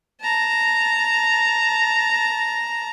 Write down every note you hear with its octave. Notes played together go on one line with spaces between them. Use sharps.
A5 A#5